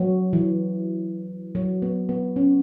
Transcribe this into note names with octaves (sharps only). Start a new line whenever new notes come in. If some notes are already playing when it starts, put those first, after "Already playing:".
Already playing: F#3
E3
F#3
B3
B3
C#4